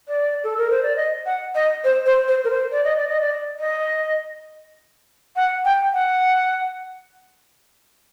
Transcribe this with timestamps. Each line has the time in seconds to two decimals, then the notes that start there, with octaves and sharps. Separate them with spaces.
0.08 D5
0.44 A4
0.57 A#4
0.70 C5
0.83 D5
0.96 D#5
1.26 F#5
1.55 D#5
1.84 C5
2.06 C5
2.28 C5
2.44 A#4
2.50 C5
2.72 D5
2.84 D#5
2.96 D5
3.08 D#5
3.21 D5
3.59 D#5
5.36 F#5
5.65 G5
5.93 F#5